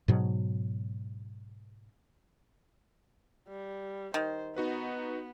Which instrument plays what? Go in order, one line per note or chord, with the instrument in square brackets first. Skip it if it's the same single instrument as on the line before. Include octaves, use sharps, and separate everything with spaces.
[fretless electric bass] G#2 B2 F#3
[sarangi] G3
[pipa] D#3 [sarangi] C5
[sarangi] B3 [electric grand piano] D#4 F#4 B4